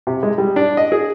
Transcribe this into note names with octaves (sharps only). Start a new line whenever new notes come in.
C3
G#3
G3
D4
D#5
G#4